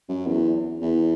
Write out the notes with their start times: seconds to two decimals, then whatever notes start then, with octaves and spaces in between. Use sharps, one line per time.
0.09 F#2
0.27 E2
0.81 E2